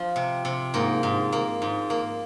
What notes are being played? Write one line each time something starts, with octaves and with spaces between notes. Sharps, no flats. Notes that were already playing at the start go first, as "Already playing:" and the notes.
Already playing: F3
C3
C3
G#2 A#3 A#4
G#2
A#3
G#2
A#3